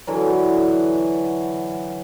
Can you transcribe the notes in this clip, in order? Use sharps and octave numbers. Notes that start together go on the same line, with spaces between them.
D3 E3 F#3